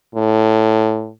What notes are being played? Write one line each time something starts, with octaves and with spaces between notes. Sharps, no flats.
A2